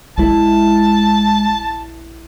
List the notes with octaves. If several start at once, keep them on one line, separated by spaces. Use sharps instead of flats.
A#1 G#3 E4 A5